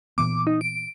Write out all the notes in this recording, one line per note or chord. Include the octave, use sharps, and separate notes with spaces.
A#2 E3 B3 D6
D#4
D7